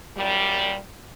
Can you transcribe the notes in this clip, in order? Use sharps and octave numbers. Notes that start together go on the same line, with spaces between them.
F#2 A#2 G3